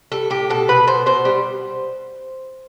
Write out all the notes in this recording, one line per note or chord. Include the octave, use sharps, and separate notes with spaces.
G3 A4
A2 G4
B2 A4
B2 B4
B2 C5
B2 C5
G3